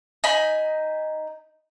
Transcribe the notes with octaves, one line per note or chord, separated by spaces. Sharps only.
D#4 G#5 B5